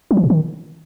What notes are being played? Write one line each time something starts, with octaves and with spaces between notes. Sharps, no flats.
F#3
E3
A#2
D#3